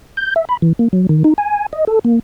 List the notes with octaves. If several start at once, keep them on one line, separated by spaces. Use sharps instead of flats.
G6
E5
B5
E3
A#3
F#3
D#3
D#4
G#5
D#5
A4
A#3